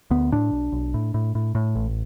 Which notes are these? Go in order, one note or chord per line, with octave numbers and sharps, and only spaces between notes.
D2 B3
A2 D4
B1
B1
A2
A2
A2
A2
A1